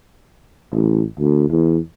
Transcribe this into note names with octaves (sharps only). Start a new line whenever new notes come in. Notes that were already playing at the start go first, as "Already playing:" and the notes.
A1
D2
E2